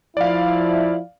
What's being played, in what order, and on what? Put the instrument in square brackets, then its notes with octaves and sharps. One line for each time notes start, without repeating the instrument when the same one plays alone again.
[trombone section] F3 E4 [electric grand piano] D5 F5